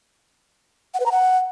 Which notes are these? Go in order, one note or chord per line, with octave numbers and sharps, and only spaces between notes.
F#5
B4
A#5
F#5